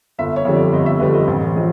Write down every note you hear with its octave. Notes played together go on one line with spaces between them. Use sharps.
G1 E5
C#5
F2 D3 G3
D5
G1 D#5
E5
F2 D3 G3 B4
D#5
A1
F3 G#3